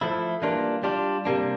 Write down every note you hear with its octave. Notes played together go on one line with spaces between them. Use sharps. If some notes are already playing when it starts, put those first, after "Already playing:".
F3 A3 E4
E3 G3 A#3 D4 F4
G3 D4 F4
C3 G3 A#3 D4